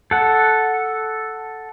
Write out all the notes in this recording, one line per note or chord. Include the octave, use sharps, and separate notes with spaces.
A4 F#5